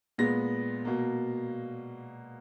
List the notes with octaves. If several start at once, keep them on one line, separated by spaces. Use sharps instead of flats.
A#2 G#3 B3 A#6
B2 A#3